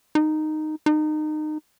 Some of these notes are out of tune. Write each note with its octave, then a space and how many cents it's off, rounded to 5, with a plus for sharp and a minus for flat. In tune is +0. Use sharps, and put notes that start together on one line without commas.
D#4 -10
D#4 -25